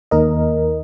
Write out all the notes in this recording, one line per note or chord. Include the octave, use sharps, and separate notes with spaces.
D#2 D#3 A#3 A#4 D#5